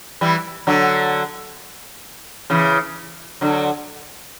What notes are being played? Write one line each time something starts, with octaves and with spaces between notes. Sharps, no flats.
E3 G3
D3 F#3
C#3 E3
D3 F#3